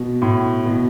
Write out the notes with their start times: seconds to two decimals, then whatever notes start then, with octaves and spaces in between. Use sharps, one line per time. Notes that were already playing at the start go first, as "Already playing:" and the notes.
Already playing: B2
0.22 A2
0.65 B2